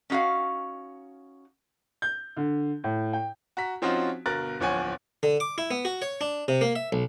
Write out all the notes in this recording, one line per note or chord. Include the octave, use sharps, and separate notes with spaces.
C#4 D#4 F4 F#4 F5
G6
D3
A2
G5
F#4 A#5 B6
F3 C4 C#4 D#4 F4 F#4
G1 B2 A#4 F#6 A6
D1 G1 F3 C#5 F#5 G#5
D3
D6
E4
B3
F#4
C#5
D4
C3
A#3
E5
B1